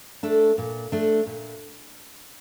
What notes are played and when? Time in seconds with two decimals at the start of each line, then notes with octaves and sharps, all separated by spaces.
0.23 A3 D4 A4
0.58 A#2
0.92 A3 D4 A4
1.26 A#2